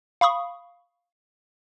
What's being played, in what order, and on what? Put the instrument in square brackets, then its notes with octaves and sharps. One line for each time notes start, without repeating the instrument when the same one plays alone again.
[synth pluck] F5 B5 C#6 D#6